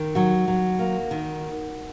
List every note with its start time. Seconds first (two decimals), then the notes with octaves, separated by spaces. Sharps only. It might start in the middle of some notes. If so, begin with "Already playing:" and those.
Already playing: D#3
0.15 F#3 F#4
0.48 F#3
0.79 A#3
1.11 D#3